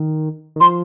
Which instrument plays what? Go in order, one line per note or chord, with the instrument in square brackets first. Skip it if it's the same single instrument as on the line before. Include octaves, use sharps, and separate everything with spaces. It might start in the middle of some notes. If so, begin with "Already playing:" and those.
Already playing: [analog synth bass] D#3
D#3
[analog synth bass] F3 [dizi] C6